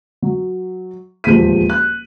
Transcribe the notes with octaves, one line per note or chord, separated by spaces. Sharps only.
F#3
D#1 E2 F3 G#3 B6 D#7
F#6